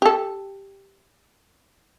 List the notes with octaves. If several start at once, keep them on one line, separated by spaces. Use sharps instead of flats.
G4 A4